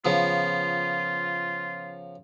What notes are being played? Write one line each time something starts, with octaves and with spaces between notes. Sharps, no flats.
C#3 F3 B3 F4